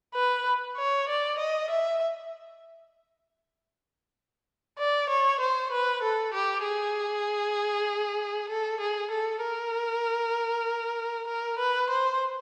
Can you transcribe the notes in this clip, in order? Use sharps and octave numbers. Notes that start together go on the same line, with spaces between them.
B4
C#5
D5
D#5
E5
D5
C#5
C5
B4
A4
G4
G#4
A4
G#4
A4
A#4
A#4
B4
C5